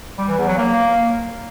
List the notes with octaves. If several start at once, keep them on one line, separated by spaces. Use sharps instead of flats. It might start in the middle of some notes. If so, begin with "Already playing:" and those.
G3
E3
E2
F#3
A#3